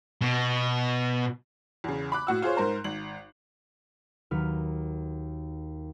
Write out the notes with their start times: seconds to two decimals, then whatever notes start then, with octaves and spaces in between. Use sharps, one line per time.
0.21 B2
1.84 E2 C#3
2.12 B5 D6 F#6
2.27 A2 F#4 E6
2.42 F4 G#4 C5 C#5
2.57 G#2 A#4 C5 A#5
2.84 G#1 F#7
4.31 D#2 F#3 B4 F6